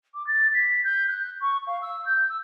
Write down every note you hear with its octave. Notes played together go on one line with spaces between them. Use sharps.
D6
A6
B6
G6
F#6
C#6
F5
E6
G6
E6